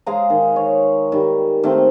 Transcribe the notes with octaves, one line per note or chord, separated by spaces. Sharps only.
G#3 G#4 F5 A#5
D#3
C#5
D#3 G3
D#3 A3 C4